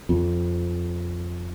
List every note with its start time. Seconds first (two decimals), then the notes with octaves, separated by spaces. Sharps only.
0.09 F2